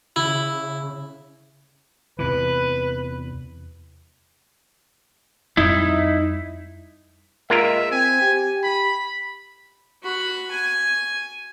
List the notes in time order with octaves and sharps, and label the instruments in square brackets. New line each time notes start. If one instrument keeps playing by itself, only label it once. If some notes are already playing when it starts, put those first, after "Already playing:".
[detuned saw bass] C#3 [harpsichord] E4
[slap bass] E2 C3 E3 [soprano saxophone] B4
[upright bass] F2 G3 [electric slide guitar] D#4 E4
[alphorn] G#3 [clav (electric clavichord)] A#3 F4 A#4 [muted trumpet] E5
[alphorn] C4 [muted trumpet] G#5
[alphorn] G4
[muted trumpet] B5
[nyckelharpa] F#4 B5
G#5